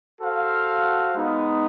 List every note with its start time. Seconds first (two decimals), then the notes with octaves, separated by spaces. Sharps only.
0.21 F#4 A4 C5 F5
1.13 G#3 B3 D#4